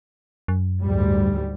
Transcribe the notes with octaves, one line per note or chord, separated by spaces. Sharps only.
F#2
D2 G#2 G3